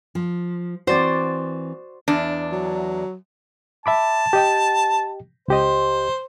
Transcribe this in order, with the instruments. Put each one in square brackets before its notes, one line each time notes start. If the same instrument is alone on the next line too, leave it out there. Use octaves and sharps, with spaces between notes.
[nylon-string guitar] F3
[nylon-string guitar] E3 C4 [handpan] F#4 D5 [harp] C5 A6
[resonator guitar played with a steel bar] E2 D4
[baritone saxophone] F#3
[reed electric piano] E5 B5 D6 [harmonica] A5
[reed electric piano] G4 D#5 G5
[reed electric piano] C#2 G4 D#5 [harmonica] C5